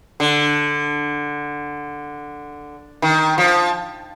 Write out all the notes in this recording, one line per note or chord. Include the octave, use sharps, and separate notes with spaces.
D3
D#3
F3